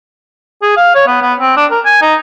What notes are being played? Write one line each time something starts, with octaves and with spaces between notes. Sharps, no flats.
G#4
F5
C#5
B3
B3
C4
D4
A#4
G#5
D#4